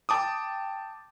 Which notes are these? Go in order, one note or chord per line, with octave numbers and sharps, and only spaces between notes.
G5 A5 D6 D#6